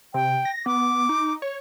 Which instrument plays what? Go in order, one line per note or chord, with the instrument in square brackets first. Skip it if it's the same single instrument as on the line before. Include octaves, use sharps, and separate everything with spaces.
[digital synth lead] C3 [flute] G5
[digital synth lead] A#6
[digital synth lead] B3 [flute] D6
[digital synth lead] D#4
C#5